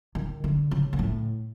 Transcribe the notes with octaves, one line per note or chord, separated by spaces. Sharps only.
D#3
D3
C#3
A#2
A2